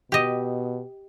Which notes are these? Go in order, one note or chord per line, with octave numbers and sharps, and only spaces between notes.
B2 G4 D#5